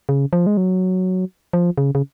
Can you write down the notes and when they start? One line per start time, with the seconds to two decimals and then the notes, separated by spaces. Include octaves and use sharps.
0.09 C#3
0.33 F3
0.47 G#3
0.57 F#3
1.53 F3
1.78 C#3
1.95 C#3